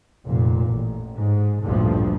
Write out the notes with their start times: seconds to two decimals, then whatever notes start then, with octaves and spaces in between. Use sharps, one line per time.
0.25 F1 A#2
0.68 A1
1.15 G#2
1.62 A1 D2 G2 A#2 F3